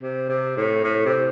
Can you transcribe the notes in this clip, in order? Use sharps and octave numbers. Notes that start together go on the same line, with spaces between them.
C3
C3
A2
A2
C3